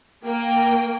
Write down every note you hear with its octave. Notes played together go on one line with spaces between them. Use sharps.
A#3 G5